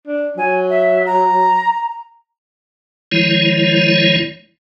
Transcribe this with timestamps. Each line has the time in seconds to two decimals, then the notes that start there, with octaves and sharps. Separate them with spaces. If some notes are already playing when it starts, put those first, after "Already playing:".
0.07 D4
0.37 F#3 G#5
0.69 E5
1.06 A#5
3.12 D#3 F3 G#3 E4 C#5